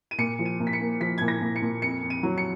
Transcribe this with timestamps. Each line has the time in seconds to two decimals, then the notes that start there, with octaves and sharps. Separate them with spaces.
0.11 D#7
0.18 A#2 C#7
0.39 F3
0.45 D#7
0.60 A#2
0.67 B6
0.73 C#7
0.80 A#3
1.00 F3 B6
1.18 A#2 G#6
1.28 A#6
1.41 A#2
1.56 C#7
1.62 A#2
1.82 F2 C#7
2.03 F2
2.10 D#7
2.23 F#3
2.38 C#7